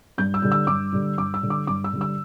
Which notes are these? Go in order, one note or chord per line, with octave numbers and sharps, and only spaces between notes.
G2 G6
E6
D3 G3
E6
G2 D6
D3 G3
G2 D6
E6
D3 G3
D6
G2 D6
E6
D3 G3
E6